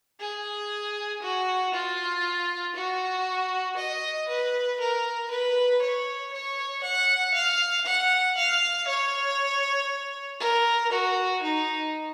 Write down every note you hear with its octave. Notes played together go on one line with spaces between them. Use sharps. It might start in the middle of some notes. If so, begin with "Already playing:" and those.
G#4
F#4
F4
F#4
D#5
B4
A#4
B4
C#5
C#5
F#5
F5
F#5
F5
C#5
A#4
F#4
D#4